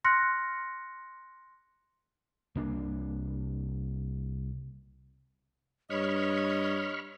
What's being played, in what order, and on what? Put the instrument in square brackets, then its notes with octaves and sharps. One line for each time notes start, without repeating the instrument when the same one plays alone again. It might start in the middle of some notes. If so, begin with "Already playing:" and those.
[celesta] C6 F6 F#6 A#6 C#7
[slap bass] C2 A#3 D4
[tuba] G2 [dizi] C#5 [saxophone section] D#5 [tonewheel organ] B5 C#6 F6